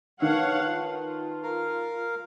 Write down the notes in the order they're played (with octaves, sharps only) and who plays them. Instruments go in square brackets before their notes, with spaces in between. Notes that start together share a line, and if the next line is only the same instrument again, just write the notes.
[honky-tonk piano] D#3 [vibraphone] B4 A5 [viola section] C#5 F5 F#5
[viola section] F4
[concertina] A#4 F5